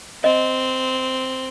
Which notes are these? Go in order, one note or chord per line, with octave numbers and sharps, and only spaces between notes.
C4 D#5